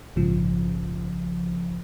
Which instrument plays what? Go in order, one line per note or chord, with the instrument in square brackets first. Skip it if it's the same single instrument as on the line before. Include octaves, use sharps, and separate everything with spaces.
[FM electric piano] A#1 G#2 C#3 F3